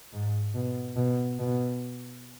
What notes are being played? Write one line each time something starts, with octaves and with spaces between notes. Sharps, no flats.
G#2
B2
B2
B2